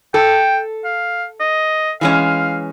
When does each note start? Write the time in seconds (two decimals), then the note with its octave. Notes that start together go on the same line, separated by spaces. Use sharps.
0.14 A4 G5
0.84 F5
1.40 D#5
2.01 E3 G#3 C#4 F5